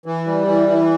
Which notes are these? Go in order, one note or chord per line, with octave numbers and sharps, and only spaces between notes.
E3
G3
E3
E3